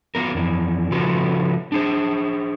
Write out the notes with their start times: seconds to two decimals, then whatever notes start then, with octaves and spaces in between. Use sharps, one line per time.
0.15 F#3 B3 A#4
0.35 F2 E3
0.92 C#3 F3 F4 F#4 A4 B4
1.72 D4 G#4 C5